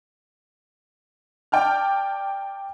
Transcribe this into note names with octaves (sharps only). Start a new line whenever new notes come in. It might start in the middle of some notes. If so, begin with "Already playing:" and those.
D5 G5 A5 F6